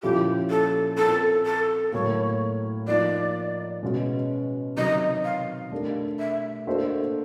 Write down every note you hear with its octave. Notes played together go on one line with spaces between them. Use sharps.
A#2 F3 A#3 C#4 E4 G4
A4
C4 F4 A4 A#4
A4
A2 F#3 A#3 C#5
F3 A#3 D#4 D5
B2 G#3 C#4 F#4 B4
C3 D#3 F#3 D#5
F5
A3 D4 G4 A#4
E5
A#3 D4 F#4 A4 C5